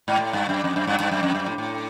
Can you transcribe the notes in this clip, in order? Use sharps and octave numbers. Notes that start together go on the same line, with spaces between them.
G#2
A2
G2
F#2
F2
F#2
G2
G2
F#2
F2
F#2
A2
A2